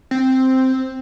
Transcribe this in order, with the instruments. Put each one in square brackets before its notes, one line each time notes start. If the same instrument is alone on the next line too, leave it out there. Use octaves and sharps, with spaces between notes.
[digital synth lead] C4